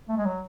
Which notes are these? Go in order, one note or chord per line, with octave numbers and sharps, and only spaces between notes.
A3
G#3
F#3